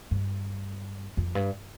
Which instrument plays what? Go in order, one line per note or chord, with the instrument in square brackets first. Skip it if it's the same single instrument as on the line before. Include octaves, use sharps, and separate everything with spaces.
[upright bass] G2
F2
G2